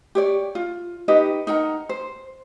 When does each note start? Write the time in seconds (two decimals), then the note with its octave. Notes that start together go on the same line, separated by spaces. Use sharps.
0.15 G4 C#5 D5
0.55 F4
1.08 D#4 G4 B4 D#5
1.47 D#4 A#4 F#5 A#5
1.89 C5